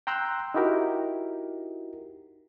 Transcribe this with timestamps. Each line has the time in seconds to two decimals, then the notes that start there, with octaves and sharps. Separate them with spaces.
0.07 G5 A#5 C6 E6 F#6 G6
0.54 D#4 E4 F#4 G4 A#4